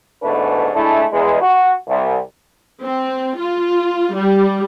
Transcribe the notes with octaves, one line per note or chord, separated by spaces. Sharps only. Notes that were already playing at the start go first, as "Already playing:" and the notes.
E2 G#2 B2 A3 D4 B4
G#3 A3 D4 E4
E2 G#3
F#4
C2
C4
F4
G3